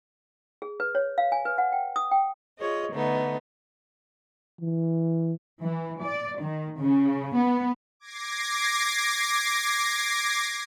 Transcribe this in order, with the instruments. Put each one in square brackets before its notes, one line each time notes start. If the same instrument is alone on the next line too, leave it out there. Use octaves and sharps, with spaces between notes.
[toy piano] G#4
B4
C#5
F5
G#5
B4
F#5
G5
D#6
G5
[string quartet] F4 G#4 C#5 D#5
D3 A3 B3 D#4
[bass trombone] E3
[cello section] E3
D5
D#3
C#3
B3
[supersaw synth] D6 G#6 A#6 C7